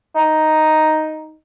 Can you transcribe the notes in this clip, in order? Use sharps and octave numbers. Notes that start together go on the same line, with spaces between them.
D#4